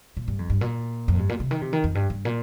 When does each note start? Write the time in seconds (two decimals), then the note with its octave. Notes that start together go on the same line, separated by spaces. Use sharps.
0.17 A#2
0.28 G2
0.39 F2
0.50 G2
0.61 A#2
1.08 F2
1.19 G2
1.29 A#2
1.40 C3
1.51 D#3
1.61 C3
1.73 D#3
1.84 F2
1.95 G2
2.10 G2
2.25 A#2